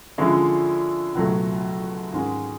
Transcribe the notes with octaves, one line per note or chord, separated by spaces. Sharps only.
D3 F3 G#3 C#4 E4
C#2 B2 F#3 A3
G#2 D#3 G#3 C#4